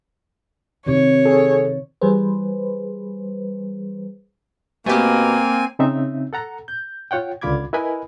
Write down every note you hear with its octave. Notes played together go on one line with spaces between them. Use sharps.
C3 D#3 C#5
G#4 A4
E3 G3 G#4 B4 C5
B2 A3 A#3 C4 G4 G#5
C#3 C4 D#4 E5
A4 F#5 A#5
G6
F4 C#5 F#5 G5
C#2 D3 F4 B5 D6 G#6
E4 A#4 B4 D#5 G#5 B5